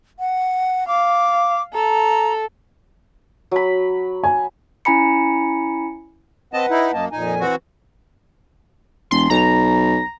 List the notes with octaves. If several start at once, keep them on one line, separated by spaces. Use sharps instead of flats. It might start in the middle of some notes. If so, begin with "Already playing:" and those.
F#5
F5 D6
A4 A#5
F#3 B5
G#5
C#4 E4 G#5 A#5 B5 C#7
C4 B4 D#5 F#5 A5
D#4 E4
F#2 A#3 D#5 A5
F2 A#2 D#4 G#5
E3 C4 F#4
E1 C6
B1 A#5